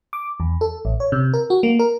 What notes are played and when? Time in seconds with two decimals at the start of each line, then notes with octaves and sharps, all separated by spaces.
0.13 D6
0.40 E2
0.61 A4
0.85 A1
1.00 C#5
1.12 C3
1.34 A#4
1.50 F#4
1.63 A#3
1.79 A#4